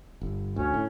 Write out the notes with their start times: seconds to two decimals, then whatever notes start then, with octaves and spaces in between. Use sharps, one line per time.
0.22 G1
0.56 D2 C#4
0.74 A2